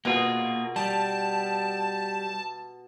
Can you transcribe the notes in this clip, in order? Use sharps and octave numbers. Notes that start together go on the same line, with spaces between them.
B2 A#3 F4 G#4
G3 A5